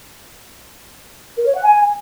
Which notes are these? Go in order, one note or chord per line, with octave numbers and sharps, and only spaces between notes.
A#4
C#5
F#5
G#5